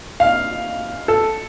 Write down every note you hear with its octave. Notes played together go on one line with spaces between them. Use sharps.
F5
A4